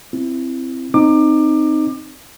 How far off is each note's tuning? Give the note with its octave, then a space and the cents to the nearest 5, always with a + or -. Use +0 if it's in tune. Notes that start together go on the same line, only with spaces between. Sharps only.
C4 +0 E4 +15
C4 +0 D#4 -10 D6 +25